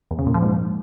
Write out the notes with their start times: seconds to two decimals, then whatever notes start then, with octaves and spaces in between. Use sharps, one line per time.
0.11 E2
0.19 C#3
0.27 A#2
0.34 F3
0.42 G#2